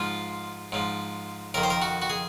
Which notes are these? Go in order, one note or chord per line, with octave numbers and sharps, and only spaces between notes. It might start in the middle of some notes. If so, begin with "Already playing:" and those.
Already playing: G#2 F3 F4
G#2 F3
F2 D#3 A#4
C5
A#4
F#4
F#4
G#4